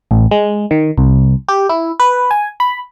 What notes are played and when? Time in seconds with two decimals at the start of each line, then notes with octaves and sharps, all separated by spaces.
0.11 A1
0.31 G#3
0.71 D#3
0.98 C2
1.48 G4
1.69 E4
2.00 B4
2.31 G#5
2.60 B5